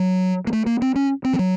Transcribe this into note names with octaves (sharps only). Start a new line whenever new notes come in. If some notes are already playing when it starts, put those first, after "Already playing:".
Already playing: F#3
A#3
A3
A#3
C4
C#4
C4
F3
F#3